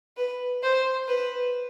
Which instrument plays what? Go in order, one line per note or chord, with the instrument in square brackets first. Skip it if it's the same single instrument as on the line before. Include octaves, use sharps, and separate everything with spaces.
[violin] B4
C5
B4